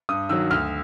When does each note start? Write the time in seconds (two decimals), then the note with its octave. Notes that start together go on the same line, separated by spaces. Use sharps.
0.09 G2 D#6
0.29 D#3 F#3 E6
0.51 D2 F6